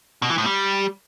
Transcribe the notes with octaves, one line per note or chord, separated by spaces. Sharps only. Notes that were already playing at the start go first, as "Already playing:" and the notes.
B2
E3
A2
G3